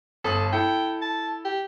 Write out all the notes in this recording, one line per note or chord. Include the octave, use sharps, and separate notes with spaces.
G1 A4 D#6 F#7
E4 A4 G5 C#7
A5
G4